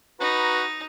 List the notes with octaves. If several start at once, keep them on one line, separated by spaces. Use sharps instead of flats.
D#4 F#4 B4 A#5 B5